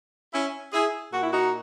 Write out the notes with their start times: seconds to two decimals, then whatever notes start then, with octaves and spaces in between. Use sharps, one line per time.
0.32 C#4 E4
0.73 E4 G#4
1.13 A#2 F#4
1.23 E4
1.33 D#4 F#4